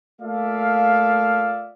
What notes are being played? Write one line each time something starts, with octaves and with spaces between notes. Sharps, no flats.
A3 A#3 F4 D5 E5 F5